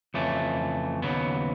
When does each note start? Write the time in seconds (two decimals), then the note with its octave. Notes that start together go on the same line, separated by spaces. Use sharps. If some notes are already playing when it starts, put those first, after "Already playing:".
0.14 F2 C#3 E3 A3
1.02 D#2 C#3 F#3 B3